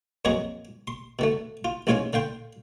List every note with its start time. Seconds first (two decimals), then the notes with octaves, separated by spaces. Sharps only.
0.25 F2 A#2 F#3 G#4 D#5 A#5
0.88 C6
1.19 B2 D3 A3
1.65 F4
1.87 A1 G#2 F4 C#5 F5 G#5
2.13 D3 F5 G5 C6